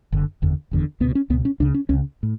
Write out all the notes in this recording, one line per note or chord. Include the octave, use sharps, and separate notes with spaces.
F#1 F#2 D3
F#1 E2 D3
F#1 E2 D3
C#2 B2 B3
C#4
C#2 B2 B3
C#4
C#2 C#3 D4
C#4
C#2 C#3 C#4
A2